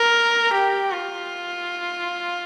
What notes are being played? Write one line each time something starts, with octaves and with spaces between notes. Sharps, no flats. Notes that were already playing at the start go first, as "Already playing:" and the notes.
Already playing: A#4
G4
F4